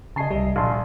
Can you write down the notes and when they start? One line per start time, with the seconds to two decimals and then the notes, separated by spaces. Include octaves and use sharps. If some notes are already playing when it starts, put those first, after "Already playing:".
0.16 C#3 D#5 G#5 A5 C7
0.31 C2 G3 D#5 E5
0.56 A#1 F5 A5 C6